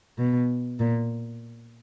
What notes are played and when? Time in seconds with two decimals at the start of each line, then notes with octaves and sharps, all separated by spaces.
0.18 B2
0.79 A#2